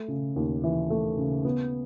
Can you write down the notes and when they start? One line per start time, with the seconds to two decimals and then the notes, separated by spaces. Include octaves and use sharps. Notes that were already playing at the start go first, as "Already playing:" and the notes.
Already playing: A3
0.08 C#3
0.36 D#2
0.64 E3
0.90 A3
1.18 C#3
1.45 B3